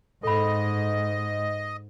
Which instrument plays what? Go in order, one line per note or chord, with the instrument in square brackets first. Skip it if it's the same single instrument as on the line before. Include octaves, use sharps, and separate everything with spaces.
[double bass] G#2 [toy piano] A4 B5 [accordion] D#5